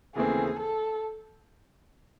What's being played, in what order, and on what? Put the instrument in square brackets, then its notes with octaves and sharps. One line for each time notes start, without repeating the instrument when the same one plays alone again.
[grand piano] D#2 C#3 E3 A3 C4 [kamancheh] G#4
[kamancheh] A4